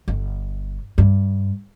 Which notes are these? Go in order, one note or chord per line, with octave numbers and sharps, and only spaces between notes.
G1
G2